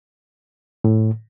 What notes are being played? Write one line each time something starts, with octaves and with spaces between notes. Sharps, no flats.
A2